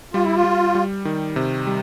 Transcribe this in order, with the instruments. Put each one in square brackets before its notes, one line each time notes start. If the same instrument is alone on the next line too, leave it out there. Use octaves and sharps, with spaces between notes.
[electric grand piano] G3 [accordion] F4
[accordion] E4
F4
[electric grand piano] G3
G3
D#3
C3
G3